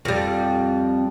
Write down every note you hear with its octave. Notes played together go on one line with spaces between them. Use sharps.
F2 G3